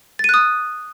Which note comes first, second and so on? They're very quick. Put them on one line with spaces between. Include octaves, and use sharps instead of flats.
A6 D#7 F#6 D#6